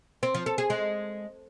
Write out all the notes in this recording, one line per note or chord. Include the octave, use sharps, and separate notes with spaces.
C4
F3
A4
G#4
G#3